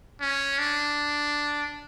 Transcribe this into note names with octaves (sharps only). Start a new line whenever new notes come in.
C#4
D4